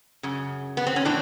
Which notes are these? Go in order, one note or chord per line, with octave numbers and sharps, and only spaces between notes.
F#2 C#3
B3
C4
C#4
A2 E3 C4 D4